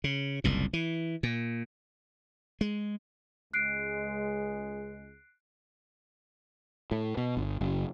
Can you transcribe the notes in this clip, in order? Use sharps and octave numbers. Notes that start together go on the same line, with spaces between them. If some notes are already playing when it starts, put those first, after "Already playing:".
C#3
F#1 C2 A#2
E3
A#2
G#3
C#2 G#3 F#6 C7 D7
A2
B2
G1
F#1